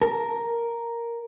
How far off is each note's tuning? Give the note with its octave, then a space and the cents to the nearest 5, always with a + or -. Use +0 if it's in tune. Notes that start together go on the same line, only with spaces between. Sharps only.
A#4 +0 A5 +0